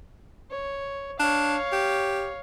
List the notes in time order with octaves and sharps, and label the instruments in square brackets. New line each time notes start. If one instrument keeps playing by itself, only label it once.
[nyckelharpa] C#5
[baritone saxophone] D4 [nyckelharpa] C#5 F5
[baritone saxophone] G4